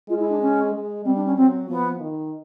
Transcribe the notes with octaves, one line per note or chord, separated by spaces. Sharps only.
G#3 F4
E4
D4
C#4
G#3
G3 C4
D4
C#4
F#3 C4
F3 B3
D#3